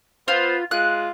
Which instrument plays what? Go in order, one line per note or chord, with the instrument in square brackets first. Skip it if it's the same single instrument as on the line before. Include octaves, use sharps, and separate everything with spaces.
[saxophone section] B3 B4 C5 [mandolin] F4
[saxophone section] G#3 F4 [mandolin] F#6